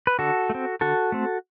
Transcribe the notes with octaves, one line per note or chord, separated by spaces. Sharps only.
B4
D3 F#4 A4
A3
C4
D3 F#4 A4
A3 C4